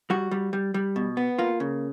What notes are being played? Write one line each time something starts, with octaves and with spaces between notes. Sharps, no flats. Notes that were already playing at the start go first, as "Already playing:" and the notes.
G3 F#4
G3
G3
G3
B2
B3
A#3 F4
C#3